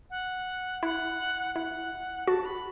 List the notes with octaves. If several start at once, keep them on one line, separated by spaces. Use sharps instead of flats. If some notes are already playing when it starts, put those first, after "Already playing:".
F#5
E4 F#5
E4 F#5
F#4 A5
B5